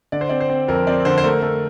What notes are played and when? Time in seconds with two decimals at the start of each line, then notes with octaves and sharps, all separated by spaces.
0.12 D3 D5
0.21 C5
0.29 C4 D5
0.40 C5
0.50 C4
0.68 F2 A#4
0.87 C4 D5
1.05 D3 C5
1.18 C5
1.24 A3 A#4
1.42 A3